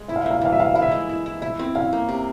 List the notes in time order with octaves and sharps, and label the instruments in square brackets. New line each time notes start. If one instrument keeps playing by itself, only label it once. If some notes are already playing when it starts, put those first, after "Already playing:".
Already playing: [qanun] G#3
[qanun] E4 [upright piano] E5
[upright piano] F5
[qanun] A#3 [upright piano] E5
[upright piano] F5
E5
[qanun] E3 [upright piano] F5
[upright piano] E5
[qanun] E3 [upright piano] F5
[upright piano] E5
[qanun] E4 [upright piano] F5
[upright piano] E5
[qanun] G#3
E4
E4
[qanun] E4 [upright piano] E5
[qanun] C4
[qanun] C#4 [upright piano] F5
[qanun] A#3
C3